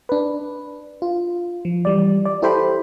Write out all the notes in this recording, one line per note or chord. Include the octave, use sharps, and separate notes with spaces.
D4 B4
F4
F3
E3 G3 D5
D5
E4 G4 A4 C5 G5 B5